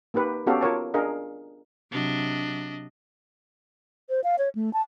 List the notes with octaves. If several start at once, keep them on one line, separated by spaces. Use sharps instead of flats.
A#3 D#4 G4 B4
B3 C#4 F#4 G4 A4 F5
F4 A#4 C#5 A5
D4 G#4 A#4 D#5 F5
C3 F#3 D4 D#5
C5
F5
C#5
A3
A5